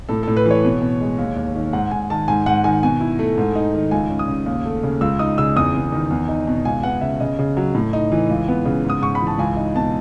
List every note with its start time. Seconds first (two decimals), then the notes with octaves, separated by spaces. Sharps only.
0.09 A2 A4
0.23 A2 A4
0.37 B4
0.46 E3 C#5
0.64 B2
0.81 B2
1.01 G#3
1.18 D#2
1.36 D#2
1.55 D#3
1.73 G#2 F#5
1.91 G#2 G#5
2.10 D#3 A5
2.28 G#2 G#5
2.46 G#2 F#5
2.64 D#3 G#5
2.83 B2 G#5
3.01 E4
3.19 A3
3.38 G#2
3.55 D#4
3.74 D#3
3.91 C#2 G#5
4.10 C#4
4.19 D#6
4.28 C#3
4.46 D#2
4.65 A3
4.83 C#3
5.01 C#2 E6
5.19 D#4 D#6
5.38 C#3 E6
5.56 E2 D#6
5.74 E2
5.92 D#3
6.10 E2
6.28 D#4
6.47 B2
6.65 C#2 G#5
6.83 B3 F#5
7.01 C#3 E5
7.20 C#3 D#5
7.39 C#3
7.57 F#3
7.75 A2
7.93 D#4
8.12 E3
8.30 C#2
8.48 B3
8.65 C#3
8.84 G#2
8.90 D#6
9.02 G#2 C#6
9.15 B5
9.21 E3
9.27 A5
9.38 C#2 G#5
9.56 D#4
9.75 B2 A5